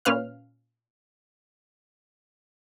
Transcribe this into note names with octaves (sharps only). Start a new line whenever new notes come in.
A#2 C#4 B4 F5 F6